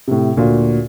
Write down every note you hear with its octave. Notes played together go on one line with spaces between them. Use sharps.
A2 C3
D2 A#2 F#4 F5